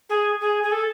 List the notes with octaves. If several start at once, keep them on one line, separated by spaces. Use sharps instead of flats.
G#4
G#4
G#4
A4